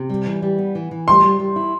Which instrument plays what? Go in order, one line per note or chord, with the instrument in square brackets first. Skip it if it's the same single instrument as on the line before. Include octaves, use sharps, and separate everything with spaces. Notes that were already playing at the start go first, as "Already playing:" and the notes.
Already playing: [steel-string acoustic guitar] C3
G3
E3
G3
B3
E3
E3
[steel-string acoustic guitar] G3 [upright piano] C6
[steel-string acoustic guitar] G3
G3
E4